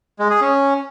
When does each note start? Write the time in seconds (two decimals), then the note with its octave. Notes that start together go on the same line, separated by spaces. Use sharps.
0.19 G#3
0.30 G#4
0.41 C#4